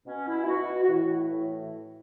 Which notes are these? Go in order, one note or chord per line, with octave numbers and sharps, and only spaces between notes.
B2 C#4
E4
E4
B2 F#4
F#4
A2 E3 E4
A2 E3